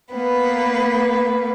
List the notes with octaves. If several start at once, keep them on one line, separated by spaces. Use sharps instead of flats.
A#3 B3 B4